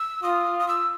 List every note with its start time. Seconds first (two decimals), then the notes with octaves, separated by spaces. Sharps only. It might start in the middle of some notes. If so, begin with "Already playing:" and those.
Already playing: E6
0.23 F4 D#6
0.60 D#6
0.68 E6